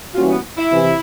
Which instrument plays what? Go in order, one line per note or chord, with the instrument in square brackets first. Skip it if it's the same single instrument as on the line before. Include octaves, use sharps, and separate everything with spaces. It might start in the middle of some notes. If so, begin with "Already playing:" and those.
[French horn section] E3 G3 A#3 C#4 F#4 [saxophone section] F4
[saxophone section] B3
E4
[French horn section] C3 E3